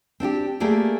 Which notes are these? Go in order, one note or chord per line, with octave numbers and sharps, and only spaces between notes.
C4 D4 F#4 G4
A3 A#3 G4 G#4 D5